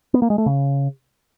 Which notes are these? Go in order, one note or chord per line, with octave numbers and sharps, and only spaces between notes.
B3
A#3
G#3
A3
C#3